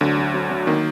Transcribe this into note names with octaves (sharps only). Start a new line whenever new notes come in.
D2 D3 F#3
F#3
F#3
F#3
D#3 A#3